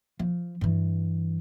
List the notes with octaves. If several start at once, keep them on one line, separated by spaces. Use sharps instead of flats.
F3
G2 E3